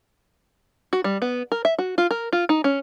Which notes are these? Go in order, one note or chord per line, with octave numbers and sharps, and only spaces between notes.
F#4
G3
B3
A#4
E5
F#4
F4
A#4
F4
D#4
C#4